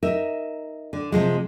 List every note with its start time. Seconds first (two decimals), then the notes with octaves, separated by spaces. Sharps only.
0.03 D#4 A#4 E5
0.93 D3
1.12 C3 F3 G#3